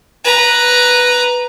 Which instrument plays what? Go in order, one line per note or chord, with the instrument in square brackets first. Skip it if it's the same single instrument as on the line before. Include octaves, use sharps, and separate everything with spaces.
[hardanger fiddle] B4 A#5